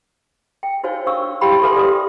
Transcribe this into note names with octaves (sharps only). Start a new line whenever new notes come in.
G5
D#4 F#4 C5 C#5 F5 G#5
D4 A#4 F5 C#6 E6
E4 G4 F5 G5 B5 C6
A4 B4 E5 G#5 C6
G4 A4 A#4 D5 F5 D#6